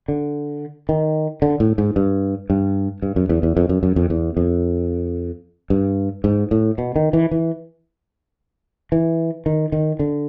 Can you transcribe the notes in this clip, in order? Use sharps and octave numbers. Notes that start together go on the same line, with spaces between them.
D3
D#3
D3
A2
G#2
G2
G2
G2
F#2
E2
E2
F2
F#2
F#2
F2
E2
F2
G2
G#2
A2
B2
D#3
E3
E3
E3
D#3
D#3
D3